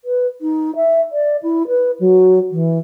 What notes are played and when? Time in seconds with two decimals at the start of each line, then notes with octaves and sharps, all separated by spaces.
0.04 B4
0.41 D#4
0.75 E5
1.12 D5
1.42 E4
1.67 B4
1.99 F#3
2.51 E3